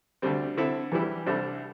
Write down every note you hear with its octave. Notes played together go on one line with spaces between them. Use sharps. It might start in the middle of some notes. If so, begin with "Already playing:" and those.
D2 D3 G3 C4
D3 C4 E4 A4
E2 E3 G3 E4 G4
C2 C3 G3 D4 A4